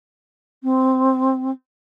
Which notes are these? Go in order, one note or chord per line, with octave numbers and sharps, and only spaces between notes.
C4